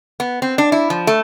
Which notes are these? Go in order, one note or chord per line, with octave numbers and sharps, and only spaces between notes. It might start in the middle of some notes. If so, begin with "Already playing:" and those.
B3
C4
D4
E4
F3
A3